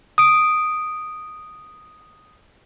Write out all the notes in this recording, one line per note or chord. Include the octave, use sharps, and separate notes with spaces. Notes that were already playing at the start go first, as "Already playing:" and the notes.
D#6 D7